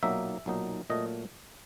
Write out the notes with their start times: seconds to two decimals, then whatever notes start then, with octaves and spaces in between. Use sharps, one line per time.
0.03 B1 A#2 F#3 A#3 D#4 E5
0.46 B1 A#2 F#3 A#3 D#4
0.90 A#2 F#3 A3 D#5